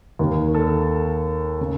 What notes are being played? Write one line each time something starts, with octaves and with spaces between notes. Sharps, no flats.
D#2 D#3
A4
C#3